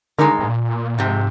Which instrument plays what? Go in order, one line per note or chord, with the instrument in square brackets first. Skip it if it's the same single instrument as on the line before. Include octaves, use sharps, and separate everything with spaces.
[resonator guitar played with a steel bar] G2 D#3 G#3 D#4 A#4 [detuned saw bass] D3
[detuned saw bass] C3
G#2
A#2
[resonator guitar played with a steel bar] F2 C3 [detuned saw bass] G#2